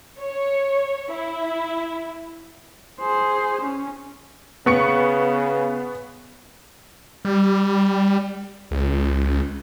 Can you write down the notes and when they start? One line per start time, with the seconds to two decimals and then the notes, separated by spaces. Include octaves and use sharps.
0.20 C#5
1.13 E4
3.00 G#4 C5
3.61 C#4
4.66 C#3 B3 C#6 C#7
7.25 G3
8.71 C#2